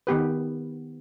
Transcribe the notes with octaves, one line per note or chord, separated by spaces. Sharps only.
D#3 B3 G4 B4